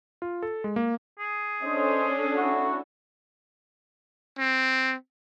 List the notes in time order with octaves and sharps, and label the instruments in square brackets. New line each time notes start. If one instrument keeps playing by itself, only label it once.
[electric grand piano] F4
A4
G#3
A#3
[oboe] G#4
[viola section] C#4 D4 A4 [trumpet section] C5 D#5
[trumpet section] A3 E4 F#4
[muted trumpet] C4